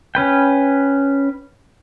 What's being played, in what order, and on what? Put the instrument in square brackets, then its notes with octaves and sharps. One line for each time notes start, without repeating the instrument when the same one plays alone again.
[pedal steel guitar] C#4 B4 G5